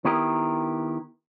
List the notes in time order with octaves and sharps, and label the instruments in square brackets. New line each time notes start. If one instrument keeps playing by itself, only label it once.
[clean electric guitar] D#3 B3 E4 G4 A#4